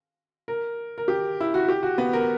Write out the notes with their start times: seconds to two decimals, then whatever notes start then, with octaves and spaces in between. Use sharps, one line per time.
0.48 A#4
0.98 A#4
1.08 G4
1.40 E4
1.54 F#4
1.69 G4
1.83 F#4
1.98 B3
2.13 A#4